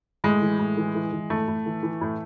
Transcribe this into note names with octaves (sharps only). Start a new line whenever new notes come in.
A2 G#3
E3
A2
E3
E3
E3
A2 A3
A2
E3
E3
A2